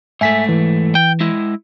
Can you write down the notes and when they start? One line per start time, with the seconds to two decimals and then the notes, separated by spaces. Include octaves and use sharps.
0.21 G#2 A3 E5 G#5 B6
0.49 E3
0.95 G5
1.20 G#3 E4